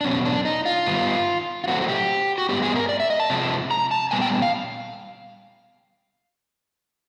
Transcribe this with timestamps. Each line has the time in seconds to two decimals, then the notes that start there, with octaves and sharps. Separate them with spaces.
0.01 D4
0.05 E2 B2 F#3 B3 C#4
0.25 D4
0.45 D#4
0.65 F4
0.86 G2 D#3 G3 B3
1.64 F4
1.68 A2 F#3 A3 C4 F#4
1.82 F#4
1.88 G4
2.38 F#4
2.49 G2 E3 G#3 B3 G4
2.62 G#4
2.76 A#4
2.89 D5
3.00 E5
3.10 D#5
3.20 A5
3.30 C3 F3 G#3
3.71 A#5
3.91 A5
4.11 A#2 G3 B3 G#5
4.21 G5
4.42 F5